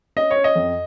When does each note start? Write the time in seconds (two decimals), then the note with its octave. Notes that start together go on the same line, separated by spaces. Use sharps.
0.16 C#4 D#5
0.31 C#5
0.36 C#4
0.44 D#5
0.56 F2